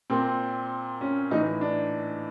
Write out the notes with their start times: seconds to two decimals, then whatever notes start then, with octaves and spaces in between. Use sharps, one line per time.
0.10 A#2 C4
1.01 C#4
1.31 A2 E3 D#4
1.61 D4